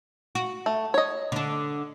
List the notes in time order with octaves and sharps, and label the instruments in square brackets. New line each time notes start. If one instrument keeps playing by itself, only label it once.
[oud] F#4
[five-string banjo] A3
C#5 D#5
[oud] D3 D4